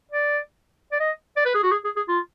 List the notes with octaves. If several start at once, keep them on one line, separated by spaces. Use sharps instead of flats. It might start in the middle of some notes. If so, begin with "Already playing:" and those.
D5
D5
D#5
D5
B4
G#4
F#4
G#4
G#4
G#4
F4